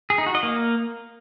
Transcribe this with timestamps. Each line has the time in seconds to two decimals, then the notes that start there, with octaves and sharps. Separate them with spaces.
0.10 G#4
0.18 D#4
0.26 F#4
0.35 D#5
0.43 A#3